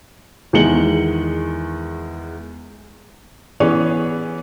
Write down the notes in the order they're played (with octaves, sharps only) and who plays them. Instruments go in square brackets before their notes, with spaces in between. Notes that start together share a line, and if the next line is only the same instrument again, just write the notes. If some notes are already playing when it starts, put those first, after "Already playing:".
[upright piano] E2 D#3 G#3 C#7 F#7 G7
[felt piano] E3 B3 C#4 G#4 C#5